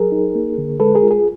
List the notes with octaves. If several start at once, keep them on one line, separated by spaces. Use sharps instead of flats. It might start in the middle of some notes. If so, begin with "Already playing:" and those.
Already playing: F#3 G#4 A#4
D#4
A#3
D3
G#3 A4 B4
G#4 A#4
F4
G#4